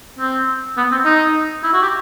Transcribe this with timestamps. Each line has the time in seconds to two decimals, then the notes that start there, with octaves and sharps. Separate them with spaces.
0.19 C4
0.77 B3
0.91 C4
1.05 D#4
1.63 E4
1.73 F#4
1.82 G4